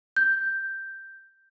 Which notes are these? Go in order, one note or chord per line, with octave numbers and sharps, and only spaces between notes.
G6